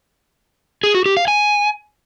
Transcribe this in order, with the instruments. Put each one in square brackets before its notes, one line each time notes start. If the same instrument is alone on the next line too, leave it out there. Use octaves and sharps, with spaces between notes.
[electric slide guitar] G#4
F#4
G4
F5
G#5